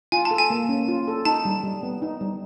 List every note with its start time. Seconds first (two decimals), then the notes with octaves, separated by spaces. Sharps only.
0.12 F4 G#5
0.25 A5
0.31 A4
0.38 G#5
0.50 A#3
0.69 C#4
0.88 F4
1.08 A4
1.25 D#4 A5
1.45 G3
1.64 G3
1.83 B3
2.02 D#4
2.21 G3